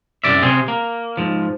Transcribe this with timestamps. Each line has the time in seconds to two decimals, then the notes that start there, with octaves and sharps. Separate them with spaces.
0.24 C2 F#2 D5 E5
0.42 C3 C4 G#4
0.68 A#3
1.17 G#2 F3